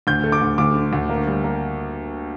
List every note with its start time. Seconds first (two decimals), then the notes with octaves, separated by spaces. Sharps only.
0.07 D2 G6
0.24 A3
0.32 D6
0.41 D2
0.58 D2 D6
0.75 D3
0.93 D2
1.10 A#3
1.27 G3
1.44 A#3